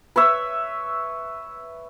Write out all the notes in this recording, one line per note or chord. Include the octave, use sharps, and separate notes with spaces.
B4 C#5 E5